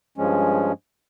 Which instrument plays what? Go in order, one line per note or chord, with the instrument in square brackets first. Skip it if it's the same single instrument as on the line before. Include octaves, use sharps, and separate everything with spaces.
[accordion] G2 F3 G#3 C#4